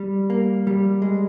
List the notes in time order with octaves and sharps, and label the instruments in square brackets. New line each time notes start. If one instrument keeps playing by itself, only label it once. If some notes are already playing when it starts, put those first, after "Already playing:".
Already playing: [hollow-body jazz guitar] G3
A#3
G3
G#3